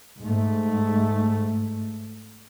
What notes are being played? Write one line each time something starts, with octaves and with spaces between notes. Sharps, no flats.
G#2 A3